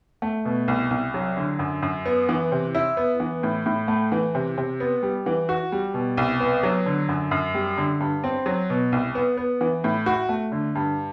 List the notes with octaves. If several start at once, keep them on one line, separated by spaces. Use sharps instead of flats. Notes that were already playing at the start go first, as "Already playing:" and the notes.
A3
B2
C2
C2
F#3
D3
F#2
F#2
B3
E3
C3
E4
B3
E3
A2
A2
A3
E3
C3
C3
B3
G3
E3
F#4
G3
B2
C2
B3
F#3
D3
F#2
F#2
G3
D3
G2
C4
F#3
B2
C2
B3
B3
E3
A2
F#4
A3
D3
G2